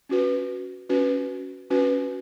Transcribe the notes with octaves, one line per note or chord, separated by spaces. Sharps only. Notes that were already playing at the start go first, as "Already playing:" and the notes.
C#4 F#4 B4
C#4 F#4 B4
C#4 F#4 B4